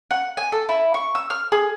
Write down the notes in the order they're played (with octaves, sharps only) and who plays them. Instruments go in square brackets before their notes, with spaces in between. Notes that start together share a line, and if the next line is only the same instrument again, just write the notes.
[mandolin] F#5
G#5
A4
E4
C#6
E6
F6
G#4